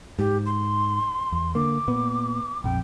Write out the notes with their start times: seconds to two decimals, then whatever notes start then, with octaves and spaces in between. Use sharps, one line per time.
0.19 G#2 G4
0.46 C6
1.32 E2
1.55 D3 A#3 D6
1.88 A#2 B3
2.64 A#1 F2 G5